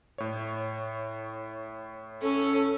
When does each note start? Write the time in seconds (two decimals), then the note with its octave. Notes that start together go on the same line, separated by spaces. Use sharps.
0.18 A2 C#5
2.22 C#4 A4